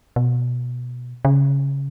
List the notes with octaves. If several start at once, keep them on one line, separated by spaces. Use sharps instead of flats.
B2
C#3